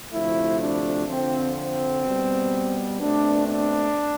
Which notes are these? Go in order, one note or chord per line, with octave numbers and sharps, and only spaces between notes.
D2 C3 F3 A3 E4
D4
F2 D3 F3 C4
C4
B2 G3 B3
B2 A3 C4 D4
D4